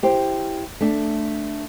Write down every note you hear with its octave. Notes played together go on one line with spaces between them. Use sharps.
E4 G4 C5
A3 D4